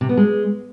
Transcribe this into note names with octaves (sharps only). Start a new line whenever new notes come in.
C3
B3
G#3